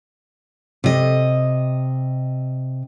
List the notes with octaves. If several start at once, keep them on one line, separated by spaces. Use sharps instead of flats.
C3 D#5